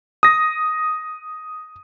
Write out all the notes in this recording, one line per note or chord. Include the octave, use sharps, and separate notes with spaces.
D#6 A#6